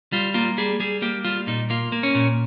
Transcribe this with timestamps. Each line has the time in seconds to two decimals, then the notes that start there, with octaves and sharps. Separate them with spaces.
0.12 G3 F4
0.34 A#3 F4
0.58 G3 G#4
0.80 G3 G#4
1.02 A#3 G4
1.25 G3 F4
1.47 A#2 D#4
1.70 A#3 F4
1.92 A#3
2.03 C#4
2.15 A#2